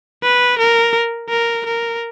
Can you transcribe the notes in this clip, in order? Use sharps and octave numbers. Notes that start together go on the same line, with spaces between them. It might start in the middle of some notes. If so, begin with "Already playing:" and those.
B4
A#4
A#4
A#4